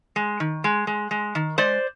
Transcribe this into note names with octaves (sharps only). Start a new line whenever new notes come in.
G#3
D#3
G#3
G#3
G#3
D#3
G#3 C5 D5